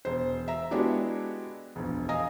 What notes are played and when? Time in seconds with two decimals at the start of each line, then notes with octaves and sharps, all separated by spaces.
0.05 E1 C5
0.48 E5 A#5
0.71 G#3 B3 D4 E4 F#4 G4
1.76 E1 A#1
2.09 D#5 F5 G#5 A#5 D#6 A#6